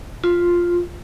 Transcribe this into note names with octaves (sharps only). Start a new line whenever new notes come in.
F4